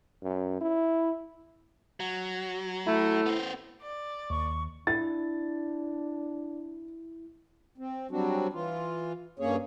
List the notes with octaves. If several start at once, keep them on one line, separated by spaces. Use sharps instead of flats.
F#2
E4
F#3
A3 E4
B3 C5
D5
D#2 C#6
D4 E4 A6
C4
F#3 G3 C4 D4 F#4
E3 F4
G2 A#3 C#4 G#4 C#5